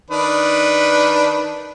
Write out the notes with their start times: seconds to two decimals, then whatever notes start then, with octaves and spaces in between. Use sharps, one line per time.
0.10 D#3 D4 B4